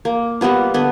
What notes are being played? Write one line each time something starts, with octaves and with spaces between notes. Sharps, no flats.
A#3
G3 A#3 B3 F4
D3 B3